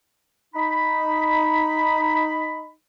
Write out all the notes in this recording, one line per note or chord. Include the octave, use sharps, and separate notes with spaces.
D#4 B5